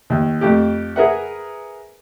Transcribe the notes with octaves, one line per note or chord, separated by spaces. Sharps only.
D#2
F2 A3 G4
G#4 A#4 B4 E5 F#5